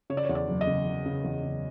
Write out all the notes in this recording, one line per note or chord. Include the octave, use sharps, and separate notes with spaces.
C#3 C#5
D5
C#5
E2
D5
F#1
D#5
C#3
F#1
C#3
E2
C#3